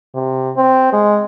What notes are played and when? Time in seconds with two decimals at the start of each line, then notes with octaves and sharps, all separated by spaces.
0.15 C3
0.56 C4
0.93 G#3